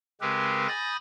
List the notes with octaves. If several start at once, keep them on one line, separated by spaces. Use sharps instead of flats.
C#3 G#3 C4 G4 A#4 B4
G#5 B5 D#6 G6 A6 A#6